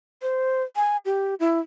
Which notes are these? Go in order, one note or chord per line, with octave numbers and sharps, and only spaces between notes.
C5
G#5
G4
E4